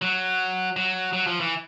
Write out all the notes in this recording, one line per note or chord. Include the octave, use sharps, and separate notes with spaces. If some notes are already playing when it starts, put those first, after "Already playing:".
F#3
F#3
F#3
F3
E3